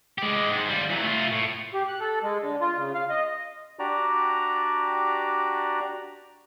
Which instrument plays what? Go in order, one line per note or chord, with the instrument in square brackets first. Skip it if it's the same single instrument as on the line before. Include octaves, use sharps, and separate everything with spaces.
[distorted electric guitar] G#3 G4
G#2
G3 F4
E3 F#3
A3 F4
A2
[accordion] G4
F#6
A4
G#3
D3
F4
C#3
F5
D#5
[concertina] D4 F#4 G4 D5 A#5